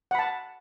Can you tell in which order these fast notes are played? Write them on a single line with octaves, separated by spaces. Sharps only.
F#5 B5 A5